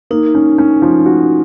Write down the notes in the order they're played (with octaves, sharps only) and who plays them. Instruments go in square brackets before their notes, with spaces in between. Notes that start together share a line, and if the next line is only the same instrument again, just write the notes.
[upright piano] A#3 [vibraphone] D#4
[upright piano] C#4
C#4
F3
F#4